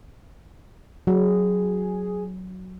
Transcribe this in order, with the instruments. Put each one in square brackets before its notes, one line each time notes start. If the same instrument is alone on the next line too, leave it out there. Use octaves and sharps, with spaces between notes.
[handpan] F#3 [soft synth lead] G#4